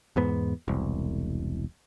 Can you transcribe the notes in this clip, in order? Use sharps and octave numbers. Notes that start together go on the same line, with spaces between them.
E2 G#2 B3
E1 C2